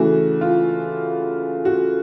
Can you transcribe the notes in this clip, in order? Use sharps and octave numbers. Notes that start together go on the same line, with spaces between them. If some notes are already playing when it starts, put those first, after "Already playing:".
Already playing: C#3 E3 A3 F#4
F4
F#4